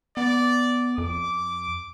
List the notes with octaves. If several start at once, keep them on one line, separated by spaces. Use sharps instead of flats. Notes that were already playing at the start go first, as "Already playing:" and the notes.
B3 D5
F2 D6